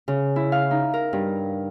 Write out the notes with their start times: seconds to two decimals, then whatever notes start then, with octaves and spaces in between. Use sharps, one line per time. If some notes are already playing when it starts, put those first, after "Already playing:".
0.08 C#3
0.36 E4
0.52 F5
0.71 D#4
0.94 A#4
1.13 G2